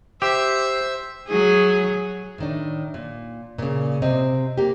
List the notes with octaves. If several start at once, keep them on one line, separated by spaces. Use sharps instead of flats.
G4 C5 E5 E6
F#3 G#4
A2 D#3 D4
A#2
A#2 C#3
C3 C4 D#5
A#3 G4